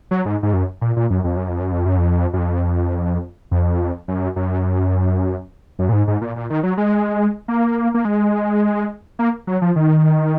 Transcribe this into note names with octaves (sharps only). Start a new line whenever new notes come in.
F#3
G#2
G#2
F#2
A#2
A#2
F#2
F2
F#2
F2
F#2
F2
F#2
F2
F#2
F2
F2
F#2
F#2
F#2
A#2
G#2
G#2
A#2
A#2
D#3
F#3
G#3
A#3
A#3
G#3
A#3
F#3
F3
D#3